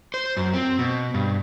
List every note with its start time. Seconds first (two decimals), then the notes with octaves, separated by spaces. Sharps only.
0.14 C5
0.37 F#2
0.54 C4
0.79 B2
1.14 G2